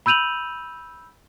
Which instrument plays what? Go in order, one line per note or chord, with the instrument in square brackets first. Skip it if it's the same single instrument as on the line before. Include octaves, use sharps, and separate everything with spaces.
[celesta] B5 E6 G6 D#7 F7 F#7